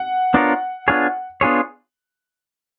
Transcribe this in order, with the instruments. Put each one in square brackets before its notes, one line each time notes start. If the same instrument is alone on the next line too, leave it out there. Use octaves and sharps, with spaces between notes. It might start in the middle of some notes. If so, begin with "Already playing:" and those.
Already playing: [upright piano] F#5
[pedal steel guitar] B3 D4 F4 A#4 C#5
B3 D4 F4 G#4 C#5
B3 D4 F4 G#4 C#5